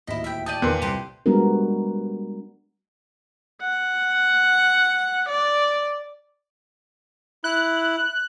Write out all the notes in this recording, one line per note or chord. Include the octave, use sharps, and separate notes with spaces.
D1 D#2 E4 D#5 B6
E5 G5
D5 G5 A5 D#6 G6 D#7
E2 A#2 D#3 B4 C6 F#6
C2 G2 G4 A4 C5
G3 G#3 B3 D4 F#4 A#4
F#5
D5
E4 F#6